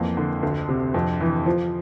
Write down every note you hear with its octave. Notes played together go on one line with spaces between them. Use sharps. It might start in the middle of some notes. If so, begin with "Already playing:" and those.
Already playing: F2 E3 A#3
D3
D2
C3
F2
E3
F3